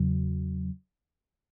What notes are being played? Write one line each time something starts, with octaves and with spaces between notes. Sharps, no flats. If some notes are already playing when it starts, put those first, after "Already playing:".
Already playing: E2 C#3 F#3